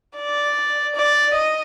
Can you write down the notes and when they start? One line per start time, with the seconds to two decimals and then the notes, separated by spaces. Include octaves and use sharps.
0.17 D5
0.95 D5
1.34 D#5